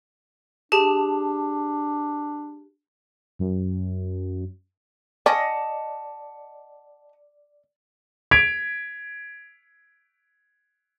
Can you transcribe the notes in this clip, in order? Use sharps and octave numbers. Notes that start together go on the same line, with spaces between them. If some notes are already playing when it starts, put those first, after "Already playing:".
D4 G4 G#4 A5
F#2
C#4 D5 D#5 F#5 A5
G#6 B6 D7 F7